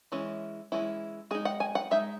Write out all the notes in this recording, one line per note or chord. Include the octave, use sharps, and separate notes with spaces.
E3 G#3 C#4 E4
E3 G#3 C#4 E4
G#3 D#4 G#4
F#5
G#5
F#5
G#3 D#4 E5